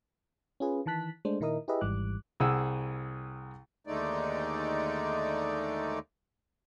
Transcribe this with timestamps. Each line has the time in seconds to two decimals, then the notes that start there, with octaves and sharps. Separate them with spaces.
0.60 C#4 F4 G#4 B4
0.86 D#3 E3 A5 F#6 B6
1.25 G#3 A3 D4 C5
1.40 A#2 D#3 E4 A#4 D#5 D#6
1.68 E4 G4 G#4 B4 D#5 E5
1.81 G#1 G#2 E3 G3 D6 F#6
2.40 C2 G#4 F#5 E6
3.87 D#2 D3 G#3 A3 D#4 D5